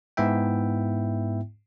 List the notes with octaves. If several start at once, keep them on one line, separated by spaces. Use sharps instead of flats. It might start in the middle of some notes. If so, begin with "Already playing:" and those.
G#2 B3 E4 E5 G5